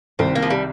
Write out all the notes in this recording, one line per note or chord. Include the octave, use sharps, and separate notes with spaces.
C2 C3 D#3 C4
A#3
F3
G3